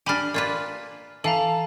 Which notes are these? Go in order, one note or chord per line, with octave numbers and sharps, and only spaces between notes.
D4 G4 G#5 B5 F6
A#3 F4 B4 D5
E3 A4 F5 A5 A#5